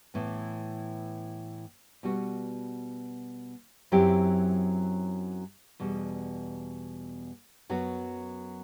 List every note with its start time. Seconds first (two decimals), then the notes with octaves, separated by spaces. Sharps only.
0.14 A2 E3 B3
2.03 B2 G3 B3 F#4
3.92 F#2 F#3 C4 E4 G4
5.80 E2 B2 G3
7.70 F#2 F#3 B3 F#4